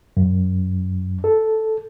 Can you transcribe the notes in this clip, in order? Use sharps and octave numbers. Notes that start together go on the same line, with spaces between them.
F#2
A4